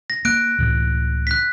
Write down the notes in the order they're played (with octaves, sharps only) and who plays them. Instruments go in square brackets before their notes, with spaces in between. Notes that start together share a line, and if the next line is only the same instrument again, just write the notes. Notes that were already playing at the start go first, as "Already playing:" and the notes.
[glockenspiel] A#6
[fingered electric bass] A#3 [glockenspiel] F#6 D7
[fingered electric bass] C#2 A2 E3
[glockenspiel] F#6 B6